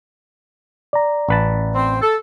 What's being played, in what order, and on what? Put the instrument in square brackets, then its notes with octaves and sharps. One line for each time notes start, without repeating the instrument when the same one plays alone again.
[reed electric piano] D5 A#5
[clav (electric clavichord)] A1 B4 A5
[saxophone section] C4
A4